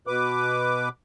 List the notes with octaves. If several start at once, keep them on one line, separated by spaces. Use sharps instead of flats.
B2 B4 D6